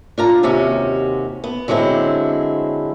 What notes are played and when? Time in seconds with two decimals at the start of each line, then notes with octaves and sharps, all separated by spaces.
0.18 D4 F4 A#5
0.43 D#2 C3 C#4 F#4
1.44 B3
1.68 D3 F#3 G#3 C4 E4